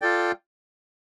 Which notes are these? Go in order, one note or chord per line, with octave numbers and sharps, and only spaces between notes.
F4 A4 D5 G5